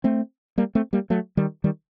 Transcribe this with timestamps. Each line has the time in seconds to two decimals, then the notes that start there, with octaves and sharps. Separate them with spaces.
0.04 A3 C4
0.58 G3 A#3
0.75 A3 C4
0.93 G3 A#3
1.10 F#3 A3
1.37 D#3 G3
1.64 D#3 G3